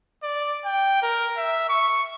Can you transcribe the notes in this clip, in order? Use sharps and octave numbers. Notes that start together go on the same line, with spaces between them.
D5
G5
A#4
E5
C#6